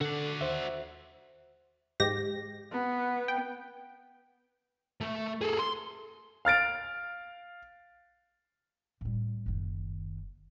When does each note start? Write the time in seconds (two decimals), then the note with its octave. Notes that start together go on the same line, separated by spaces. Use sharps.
0.01 D3 F#4 A4 D5
0.41 D#2 C5 E5
2.00 G#2 G4 A#6
2.71 B3
3.28 G5
5.01 A3
5.42 G#4 A4
5.59 C6
6.45 F5 F6 A6 D7
9.01 A2 G3
9.46 F#1 D#3